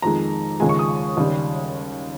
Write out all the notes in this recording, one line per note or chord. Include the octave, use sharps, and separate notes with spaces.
F2 D#3 G#3 A#5
D#2 C#3 F3 G#3 G#5
C#6
D#6
D#2 C#3 G3